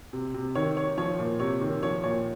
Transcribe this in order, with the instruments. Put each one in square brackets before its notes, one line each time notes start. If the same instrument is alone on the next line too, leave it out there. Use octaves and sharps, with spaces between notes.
[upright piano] C3
C3
D#3 C#5
D#3 C#5
F3 C#5
A#2
C3 C#5
D#3
F3 C#5
A#2 C#5